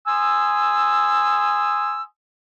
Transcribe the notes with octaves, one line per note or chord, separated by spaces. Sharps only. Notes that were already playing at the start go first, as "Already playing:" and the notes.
G#5 C6 D#6 E6